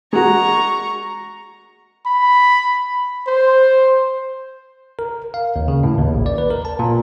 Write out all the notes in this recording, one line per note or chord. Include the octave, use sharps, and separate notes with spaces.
G#3 F#4 A#5 C#6
B5
C5
A#4
F5
D#2
C#3
A2
D#2
A#1
D5
B4
A#4
A5
A#2